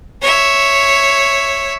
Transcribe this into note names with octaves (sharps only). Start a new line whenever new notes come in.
C#5 E5